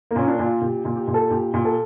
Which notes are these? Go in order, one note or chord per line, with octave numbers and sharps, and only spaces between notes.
A#3
A#2 C#4
D4
A#2
F4
A#2 G4
A#2
G4
A#2
A4
A#2 G4
A#2
A4